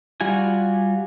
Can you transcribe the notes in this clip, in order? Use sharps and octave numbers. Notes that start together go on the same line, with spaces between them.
G3 F4 F#4 G#5